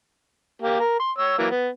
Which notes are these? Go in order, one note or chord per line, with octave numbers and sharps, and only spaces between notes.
A#3 G4
A#4
C6
C#5 E6
E3 F#3 A#3
B3